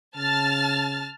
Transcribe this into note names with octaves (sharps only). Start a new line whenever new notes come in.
C#3 A5 F6 A6